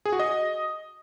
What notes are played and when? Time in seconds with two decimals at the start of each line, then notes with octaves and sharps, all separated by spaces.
0.05 G#4
0.12 F#4
0.19 D#5